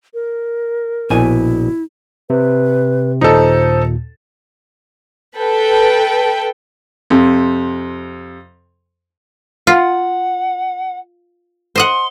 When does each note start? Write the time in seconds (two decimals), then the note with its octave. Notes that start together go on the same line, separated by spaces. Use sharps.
0.14 A#4
1.10 A#1 B2 E4 G#5
2.30 C3 B4
3.21 D#2 A#2 D#4 A4 C5
5.38 A4 B4 G5
7.10 F2 C3
9.67 F4 F#5
11.76 C5 D#5 F#5 C6